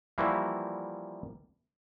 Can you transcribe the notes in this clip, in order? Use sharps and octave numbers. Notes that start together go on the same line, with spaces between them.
E3 F3 G3 A#3 E4 F#4